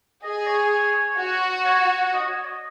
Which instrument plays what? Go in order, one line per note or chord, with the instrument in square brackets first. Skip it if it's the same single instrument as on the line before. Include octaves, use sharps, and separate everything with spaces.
[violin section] G#4 [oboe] D#5
[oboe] C#5
[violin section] F#4
[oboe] C#5
D#5
C#5
D#5